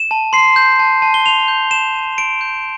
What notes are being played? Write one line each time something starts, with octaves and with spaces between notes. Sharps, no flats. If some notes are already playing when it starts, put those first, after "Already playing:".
Already playing: E7
A5
C6 C7
G6
A5
A5
G7
C6 F7
G6
A5 E7
A5
C6 D7
G6